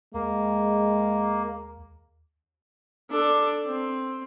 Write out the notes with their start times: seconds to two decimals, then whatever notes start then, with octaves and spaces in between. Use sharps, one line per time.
0.14 D#2 G#3 A#3
3.11 D4 A4
3.66 C4